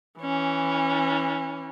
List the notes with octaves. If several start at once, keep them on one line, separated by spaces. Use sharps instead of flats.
E3 C#4